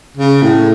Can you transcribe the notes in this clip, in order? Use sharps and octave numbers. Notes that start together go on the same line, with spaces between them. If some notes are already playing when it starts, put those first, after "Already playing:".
C#3
A2